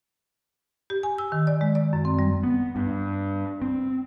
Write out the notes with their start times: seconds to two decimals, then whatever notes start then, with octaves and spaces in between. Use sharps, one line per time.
0.90 G4
1.03 G#5
1.18 E6
1.32 D#3
1.47 D5
1.61 G#3
1.75 D5
1.93 F#2
2.05 C4
2.19 G3
2.43 B3
2.76 G2
3.62 C4